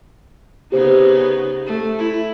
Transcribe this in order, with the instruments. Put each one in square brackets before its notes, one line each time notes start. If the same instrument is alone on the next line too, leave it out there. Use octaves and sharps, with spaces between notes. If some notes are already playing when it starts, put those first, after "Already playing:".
[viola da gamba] C#3 B3 D#4 [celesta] G4 C5
[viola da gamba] A3
E4